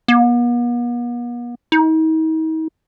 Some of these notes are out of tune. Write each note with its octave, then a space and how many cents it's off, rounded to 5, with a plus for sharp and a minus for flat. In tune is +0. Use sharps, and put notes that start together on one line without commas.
B3 -45
D#4 +40